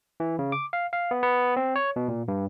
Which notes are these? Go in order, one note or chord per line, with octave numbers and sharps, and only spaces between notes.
E3
C#3
D6
F5
F5
B3
B3
C4
C#5
B2
A#2
G2